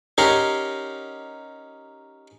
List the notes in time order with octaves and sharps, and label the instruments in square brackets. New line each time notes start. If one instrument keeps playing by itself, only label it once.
[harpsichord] C#4 D#4 G4 A#4 F#5 C6